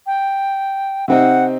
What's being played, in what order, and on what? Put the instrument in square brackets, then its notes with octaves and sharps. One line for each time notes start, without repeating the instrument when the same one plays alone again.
[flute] G5
[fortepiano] C3 C4 D#4 [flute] F#5